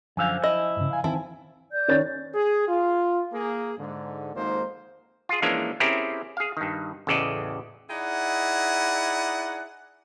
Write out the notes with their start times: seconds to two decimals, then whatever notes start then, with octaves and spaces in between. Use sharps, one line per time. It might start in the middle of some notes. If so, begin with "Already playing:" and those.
0.17 F#2 D3 F3 F5 G#5 E6 G6
0.44 E4 D#5
0.77 G2 C#3
0.91 F5 G#5
1.04 D#3 E3 C4 E4 G#5 A5
1.72 D5 G6
1.88 D#3 C#4 A6
2.34 G#4
2.68 F4
3.33 A#3 G#4
3.78 G#2 D3
4.34 G#1 F2 G#2 A#3 D#4 C5
5.29 F4 G#4
5.42 E3 F3 G#3 A#3 C#4 D4
5.80 C4 C#4 E4 G4 G#4 A#4
6.37 G#4 F5
6.57 G2 D#3
7.07 A1 E2 C#3 A4 D5 D#5
7.90 D#4 E4 G#4 D5 F#5